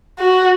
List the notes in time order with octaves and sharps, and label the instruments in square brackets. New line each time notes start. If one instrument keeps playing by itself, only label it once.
[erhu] F#4